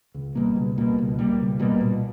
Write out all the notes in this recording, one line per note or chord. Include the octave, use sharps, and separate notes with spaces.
C#2
B2 G3 A#3
C#2
B2 G3 A#3
C#2
B2 G3 A#3
C#2
B2 G3 A#3
A#2